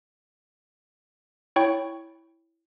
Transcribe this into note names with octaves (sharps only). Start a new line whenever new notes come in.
E4 C#5 G5 C#6